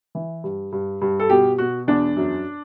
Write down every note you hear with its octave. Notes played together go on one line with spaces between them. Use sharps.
E3
G2
G2
G2
A4
B2 G4
B2 F#4
E2 D4
F#2